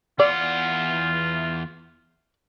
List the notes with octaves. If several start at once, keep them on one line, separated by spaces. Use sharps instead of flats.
E2 F4 D5 F#5